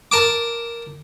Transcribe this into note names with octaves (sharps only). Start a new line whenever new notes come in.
A#4 A5 D6